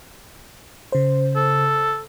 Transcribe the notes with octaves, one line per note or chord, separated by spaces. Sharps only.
C#3 C5
A4